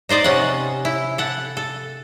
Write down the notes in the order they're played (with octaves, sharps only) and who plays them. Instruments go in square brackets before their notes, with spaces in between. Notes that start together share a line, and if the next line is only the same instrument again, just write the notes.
[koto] D#4 C5 D5 D#5
C3 C#4 F#5
E4
A4 F#5
A4